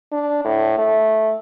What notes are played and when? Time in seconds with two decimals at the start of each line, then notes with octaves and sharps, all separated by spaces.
0.12 D4
0.44 A2
0.78 A3